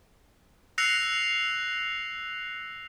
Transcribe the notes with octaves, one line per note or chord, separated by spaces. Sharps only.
E6 F#6 A#6 C7 C#7 F7